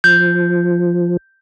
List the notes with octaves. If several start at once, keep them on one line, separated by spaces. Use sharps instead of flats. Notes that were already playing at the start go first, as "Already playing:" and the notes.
F3 G6